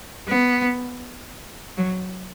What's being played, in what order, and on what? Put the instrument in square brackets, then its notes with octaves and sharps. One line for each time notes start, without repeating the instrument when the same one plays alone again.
[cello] B3
F#3